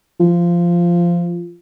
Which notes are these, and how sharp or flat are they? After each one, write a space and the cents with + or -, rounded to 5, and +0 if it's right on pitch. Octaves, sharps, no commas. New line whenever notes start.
F3 -15